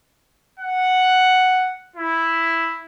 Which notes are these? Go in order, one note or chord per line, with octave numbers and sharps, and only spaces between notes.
F#5
E4